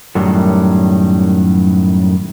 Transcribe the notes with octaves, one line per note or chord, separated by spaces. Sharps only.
F#2 A2 D#3 F#3 G3